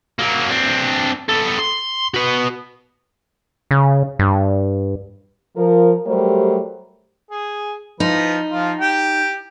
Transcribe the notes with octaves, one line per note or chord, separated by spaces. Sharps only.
F#3 A#3
C4 D4
B3 A4
C6
F#4 B4
C#3
G2
F3 A#4
F#3 G3 A3 G4 A#4 C5
G#4
F3 D#4 B4
F3 F4
G4 G5